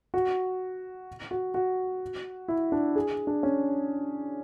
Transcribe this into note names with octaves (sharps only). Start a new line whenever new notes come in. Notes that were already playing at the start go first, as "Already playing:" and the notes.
F#4
F#4
F#4
E4
D4
G#4
D4
C#4